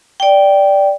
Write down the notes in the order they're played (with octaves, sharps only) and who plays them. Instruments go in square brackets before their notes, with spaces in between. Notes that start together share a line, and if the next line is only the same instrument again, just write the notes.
[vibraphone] D5 G5